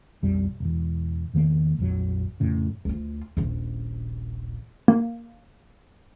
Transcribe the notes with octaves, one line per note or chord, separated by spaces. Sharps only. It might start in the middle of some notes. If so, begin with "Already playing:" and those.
B1 F2 G3
E1 E2
E2 D#3 F3 A#3
A#1 F2 F#3
F2 A2 C#3
D2 F4
D#1 A#1
A#3